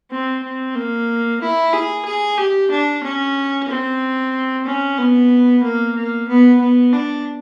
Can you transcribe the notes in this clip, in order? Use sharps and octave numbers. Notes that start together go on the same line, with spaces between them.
C4
C4
A#3
E4
G#4
G#4
G4
D4
C#4
C4
C#4
B3
A#3
A#3
B3
B3
D4